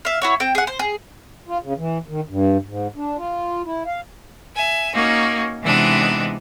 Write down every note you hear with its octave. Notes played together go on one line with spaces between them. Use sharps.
E5 F5
E4 F#4 C#5
C4 G5
G#4 F#5
C5
G#4
F4
C#3
E3
D#3
G2
G#2
D4
F4
E4
F5
E5 G#5
A#3 C#4 D#4 F#4
C3 E3 G#3 B3 D4 D#4